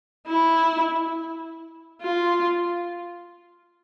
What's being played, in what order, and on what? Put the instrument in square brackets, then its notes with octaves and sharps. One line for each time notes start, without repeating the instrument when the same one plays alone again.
[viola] E4
F4